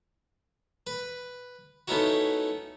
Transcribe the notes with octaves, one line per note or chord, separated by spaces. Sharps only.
B4
A3 B3 C#4 D#4 E4 F#4